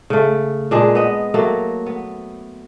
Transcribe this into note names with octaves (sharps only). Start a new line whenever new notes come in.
C#3 A3
A#2 G#3 D4 G#4
B3 D#5
F#3 A3 A#3
B3